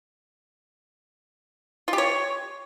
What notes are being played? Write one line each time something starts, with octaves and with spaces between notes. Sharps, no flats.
F4
G4
C#5